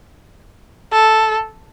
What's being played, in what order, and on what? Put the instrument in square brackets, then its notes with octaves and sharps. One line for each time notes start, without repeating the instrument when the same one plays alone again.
[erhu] A4